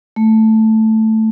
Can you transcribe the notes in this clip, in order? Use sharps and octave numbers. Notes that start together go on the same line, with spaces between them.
A3